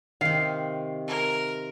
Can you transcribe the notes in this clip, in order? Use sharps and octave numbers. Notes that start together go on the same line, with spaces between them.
C3 D#3 F5 C7
A#4